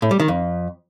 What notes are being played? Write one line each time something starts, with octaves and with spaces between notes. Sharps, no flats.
A2
G3
D#3
F2